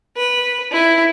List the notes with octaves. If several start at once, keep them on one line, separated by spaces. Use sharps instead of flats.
B4
E4